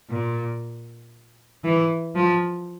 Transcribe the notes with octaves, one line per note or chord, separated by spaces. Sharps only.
A#2
E3
F3